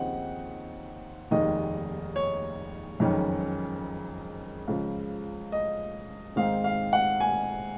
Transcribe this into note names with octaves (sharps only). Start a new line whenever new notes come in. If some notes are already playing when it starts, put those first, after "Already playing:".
Already playing: D#2 C#3 F3 C4 D#4 F#5
F1 D#2 D#3 G#3 D#5
C#5
F#1 F2 D#3 G#3 C#4
C#2 C#3 F3
D#5
G#2 D#3 G#3 C4 D#4 F5
F5
F#5
G#5